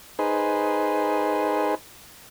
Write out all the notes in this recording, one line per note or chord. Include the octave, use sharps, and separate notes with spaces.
D#4 G#4 B4 C5